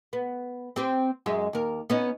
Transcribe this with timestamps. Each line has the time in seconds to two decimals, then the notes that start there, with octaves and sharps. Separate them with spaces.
0.13 B3
0.76 C4 G4 C5
1.26 F#2 G#3 E5
1.53 D#2 A#4
1.90 B3 C#4 D#4